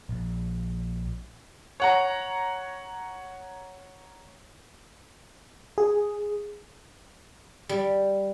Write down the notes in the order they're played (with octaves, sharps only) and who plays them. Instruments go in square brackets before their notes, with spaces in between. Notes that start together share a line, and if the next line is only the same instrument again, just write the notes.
[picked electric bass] A#1
[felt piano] C#5 F#5 A#5
[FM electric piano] G#4
[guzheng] G3